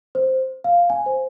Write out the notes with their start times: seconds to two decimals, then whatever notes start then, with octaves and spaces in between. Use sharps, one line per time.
0.15 C5
0.64 F5
0.90 G#5
1.06 C5